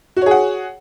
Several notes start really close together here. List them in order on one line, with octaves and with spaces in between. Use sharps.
F#4 C#5 G#4 F#5